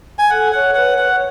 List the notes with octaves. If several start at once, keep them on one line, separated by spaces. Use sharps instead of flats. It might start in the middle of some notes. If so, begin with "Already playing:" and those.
G#5
A4 F#5
C#5 F#5
B4 F#5
C#5 F#5